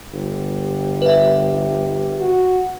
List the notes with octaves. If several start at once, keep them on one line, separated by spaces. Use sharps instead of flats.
G1 G4
B4 E5
F#4